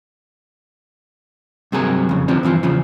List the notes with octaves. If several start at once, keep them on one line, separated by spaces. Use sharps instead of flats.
G2 C3 F#3 G#4 A#4
F2 C#3
D2 C3 F3 C4 D4
G2 E3 F3 C4
E2 C#3 F3